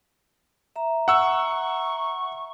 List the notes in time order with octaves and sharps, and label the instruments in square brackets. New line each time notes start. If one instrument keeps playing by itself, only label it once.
[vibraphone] E5 A#5
[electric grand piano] F#5 E6 [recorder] C#6